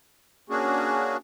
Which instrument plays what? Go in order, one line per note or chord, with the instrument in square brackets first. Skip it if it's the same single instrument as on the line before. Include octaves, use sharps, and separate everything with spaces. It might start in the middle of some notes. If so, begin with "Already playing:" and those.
[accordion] A#3 C#4 D4 F#4 G#4